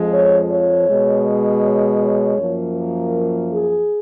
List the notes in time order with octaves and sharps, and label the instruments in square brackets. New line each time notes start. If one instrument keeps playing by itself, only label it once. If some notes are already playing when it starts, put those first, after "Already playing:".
Already playing: [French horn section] F2 F3 G#3
C#5
C#5
B2 G#3
C#5
C#5
F#2 F3 A#3
A#4
G#4